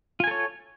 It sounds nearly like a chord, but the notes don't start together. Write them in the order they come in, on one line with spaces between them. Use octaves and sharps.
F4 G#5 A4 C#5